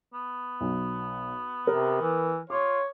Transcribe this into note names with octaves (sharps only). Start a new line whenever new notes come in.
B3
B1
C3 A#4
E3
F4 C#5 D6